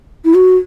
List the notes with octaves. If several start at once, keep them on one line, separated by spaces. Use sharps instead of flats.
E4
F#4